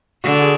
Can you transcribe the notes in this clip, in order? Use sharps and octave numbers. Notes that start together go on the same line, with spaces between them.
D3 F#4
G#4